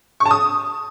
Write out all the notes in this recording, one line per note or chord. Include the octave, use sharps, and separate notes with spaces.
C#6
A5
D#6